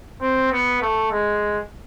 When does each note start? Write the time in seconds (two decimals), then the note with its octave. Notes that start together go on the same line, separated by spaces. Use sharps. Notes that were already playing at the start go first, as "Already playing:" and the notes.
0.21 C4
0.52 B3
0.82 A3
1.12 G#3